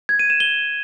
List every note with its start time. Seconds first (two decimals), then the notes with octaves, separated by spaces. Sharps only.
0.09 G#6
0.19 D#7
0.30 E7
0.40 G7